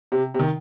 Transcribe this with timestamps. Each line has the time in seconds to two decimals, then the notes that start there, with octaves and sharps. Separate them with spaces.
0.12 C3
0.34 C3
0.39 D#3